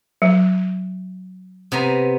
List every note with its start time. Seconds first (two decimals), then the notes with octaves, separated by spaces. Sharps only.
0.22 F#3
1.72 C3 B3 A#5